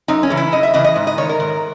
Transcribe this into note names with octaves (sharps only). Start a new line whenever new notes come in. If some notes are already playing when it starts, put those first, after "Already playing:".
F#2 D#4
C#4
C#3 E3
E4
F#2 D#5
E5
C#3 E3 D#5
D#5
G#2
D#5
D#3 C#5
A#4
G#2